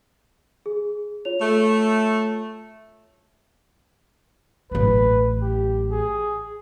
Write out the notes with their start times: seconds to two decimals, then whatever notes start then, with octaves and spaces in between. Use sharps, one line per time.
0.66 G#4
1.25 F4 C#5 F7
1.41 A3
4.71 A1 F#3 B4
5.42 G4
5.91 G#4